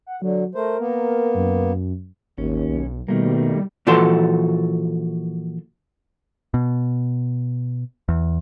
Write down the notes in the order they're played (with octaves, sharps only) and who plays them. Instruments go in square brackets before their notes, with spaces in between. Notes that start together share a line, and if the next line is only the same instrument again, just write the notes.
[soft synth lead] F#5
[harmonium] D3 [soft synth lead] F#3
[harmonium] A3 C5 [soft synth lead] A#4
[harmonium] A#3 B3
[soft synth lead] F#2
[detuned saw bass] G#1 [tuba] D#2 [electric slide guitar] C#4
[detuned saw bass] B1
[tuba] B2 [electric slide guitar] D#3 A3 A#3 [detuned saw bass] G3
[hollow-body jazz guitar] A#2 E3 F3 F#4 A4 C6
[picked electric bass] B2
E2